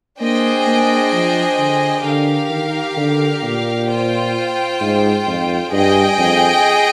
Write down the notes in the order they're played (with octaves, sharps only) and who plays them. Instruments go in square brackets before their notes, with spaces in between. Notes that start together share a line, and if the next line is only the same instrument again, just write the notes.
[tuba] A#3 [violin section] D4 G#4 C5 D#5 G5
[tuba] A#3
F3
D3
[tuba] D3 [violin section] G4 A#4 F5
[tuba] D#3
D3
A#2
[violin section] F4 C5 G5
[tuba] G#2
F2
[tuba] G2 [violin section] G#4 D#5 G5
[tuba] F2